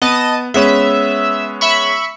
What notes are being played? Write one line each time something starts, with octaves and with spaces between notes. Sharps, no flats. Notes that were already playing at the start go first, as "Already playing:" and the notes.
B3 D#5 A5 D#7
G#3 B3 C#4 E5
E5 B5 C#6